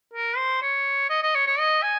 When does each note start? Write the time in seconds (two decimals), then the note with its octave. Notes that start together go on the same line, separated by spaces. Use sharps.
0.13 A#4
0.37 C5
0.62 C#5
1.10 D#5
1.23 D#5
1.35 C#5
1.47 C#5
1.59 D#5
1.83 G#5